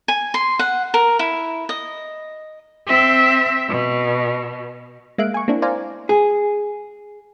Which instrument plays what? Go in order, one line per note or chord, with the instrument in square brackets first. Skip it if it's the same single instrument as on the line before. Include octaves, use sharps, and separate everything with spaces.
[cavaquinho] G#5
C6
F#5
A#4
E4
D#5
[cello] C4 E5
B2
[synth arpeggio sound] G#3 A#3 E5 F5 F#6 D7
G#5 C#6
A#3 C4 D4 E4
C5 D5 F5 G#5 A#5
[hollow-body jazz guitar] G#4